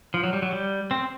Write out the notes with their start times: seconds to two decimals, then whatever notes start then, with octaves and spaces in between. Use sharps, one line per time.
0.14 F3
0.23 F#3
0.33 G3
0.42 F#3
0.52 G3
0.91 C4